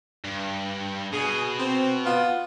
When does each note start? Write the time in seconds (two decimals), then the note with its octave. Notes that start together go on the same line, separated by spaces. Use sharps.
0.25 G2
1.13 B2 G#4
1.59 C4
2.05 B3 F4